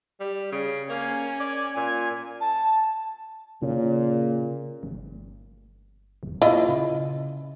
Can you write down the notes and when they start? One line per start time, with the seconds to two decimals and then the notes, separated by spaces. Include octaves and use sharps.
0.20 G3
0.52 C#3
0.89 A#3 C#4 G#5
1.40 D5
1.76 A#2 G#5
2.41 A5
3.62 A#2 C#3
4.83 G1
6.23 E1
6.42 A#2 E4 F4 D#5
6.69 C#3